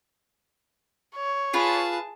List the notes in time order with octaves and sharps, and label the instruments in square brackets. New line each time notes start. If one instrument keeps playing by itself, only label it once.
[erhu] C#5
[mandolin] F4 B4 [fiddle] G#4 A5